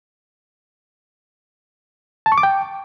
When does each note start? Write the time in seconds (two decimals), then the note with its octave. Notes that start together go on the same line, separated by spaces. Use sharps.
2.26 A5
2.32 C#6
2.38 D6
2.43 G5